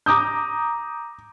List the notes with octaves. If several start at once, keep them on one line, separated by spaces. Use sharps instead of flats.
A#5 D6 D#6 G6